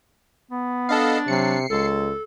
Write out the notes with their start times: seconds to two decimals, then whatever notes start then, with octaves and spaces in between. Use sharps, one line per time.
0.51 B3
0.89 D4 A4 D#5 F5
1.28 C3 F#3 C7 C#7
1.70 C#2 G#3 A4